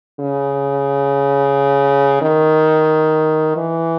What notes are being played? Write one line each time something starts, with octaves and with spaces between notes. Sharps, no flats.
C#3
D#3
E3